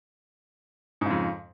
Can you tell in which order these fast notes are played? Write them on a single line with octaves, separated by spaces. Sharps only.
G#2 C#3 F2